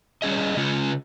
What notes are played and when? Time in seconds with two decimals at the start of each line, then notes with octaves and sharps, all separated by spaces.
0.22 G3 C#4 G#4 D#5
0.57 C#3 G#3 C#4 F4